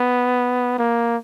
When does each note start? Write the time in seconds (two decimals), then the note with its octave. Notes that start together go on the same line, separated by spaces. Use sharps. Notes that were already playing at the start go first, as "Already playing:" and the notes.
Already playing: B3
0.78 A#3